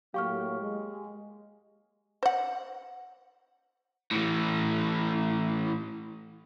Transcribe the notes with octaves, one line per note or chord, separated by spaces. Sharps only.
A2 F#3 A#3 G4 F5 C#6 F6
G#3
C5 F#5
A2 E3